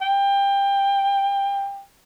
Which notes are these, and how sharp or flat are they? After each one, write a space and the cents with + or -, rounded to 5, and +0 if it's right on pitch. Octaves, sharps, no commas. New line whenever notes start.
G5 +20